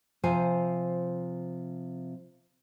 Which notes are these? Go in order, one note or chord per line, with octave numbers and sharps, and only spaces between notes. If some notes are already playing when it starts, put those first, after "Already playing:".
C3 F3 C5 G#5